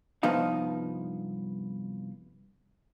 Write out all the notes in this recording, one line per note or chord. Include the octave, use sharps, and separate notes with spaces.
C2 G2 F3 B3 D#4 F5